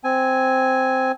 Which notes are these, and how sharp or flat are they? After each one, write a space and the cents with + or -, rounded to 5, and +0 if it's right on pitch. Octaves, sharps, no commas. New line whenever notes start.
C4 -5 G#5 +0